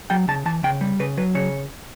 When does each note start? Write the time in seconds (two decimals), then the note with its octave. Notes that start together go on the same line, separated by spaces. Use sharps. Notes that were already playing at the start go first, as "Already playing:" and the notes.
0.10 F#3 G5
0.28 C#3 A5
0.45 E3 A5
0.63 C#3 G5
0.81 G3
0.99 C#3 B4
1.17 F#3 B4
1.35 C#3 C#5